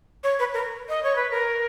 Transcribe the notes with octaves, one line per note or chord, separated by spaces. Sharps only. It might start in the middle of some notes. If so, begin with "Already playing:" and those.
C#5
B4
A#4
D#5
C#5
B4
A#4